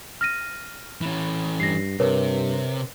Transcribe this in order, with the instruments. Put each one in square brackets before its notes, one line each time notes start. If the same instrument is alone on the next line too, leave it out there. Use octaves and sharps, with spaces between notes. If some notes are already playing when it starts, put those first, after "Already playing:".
[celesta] F6 A#6 D#7
[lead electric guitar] E3 C#4
[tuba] G2 [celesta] A#6 C7
[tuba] G2 [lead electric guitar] C3 [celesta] A#4 B4 C#5